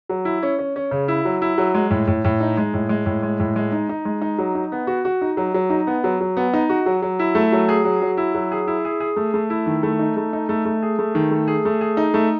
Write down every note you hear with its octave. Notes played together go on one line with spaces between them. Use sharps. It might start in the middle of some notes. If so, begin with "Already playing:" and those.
F#3
E4
C#4
C#4
C#4
C#3
E4
F#3
E4
F#3
G#3
A2
A2
A2
D#4
G#3
A2
G#3
A2
G#3
A2
G#3
D#4
D#4
G#3
D#4
F#3
D#4
B3
F#4
F#4
D#4
F#3
F#3
D#4
B3
F#3
F#3
B3
D#4
F#4
F#3
F#3
E4
A3
F#3
G#4
F#3
F#3
E4
F#3
G#4
E4
G#4
G#4
A3
A3
E4
D#3
A3
D#4
A3
D#4
A3
A3
G#4
A3
D#3
A3
G#4
A3
G#4
D#4
A3